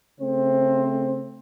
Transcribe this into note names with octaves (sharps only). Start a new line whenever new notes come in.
C#3 A3 C4 C5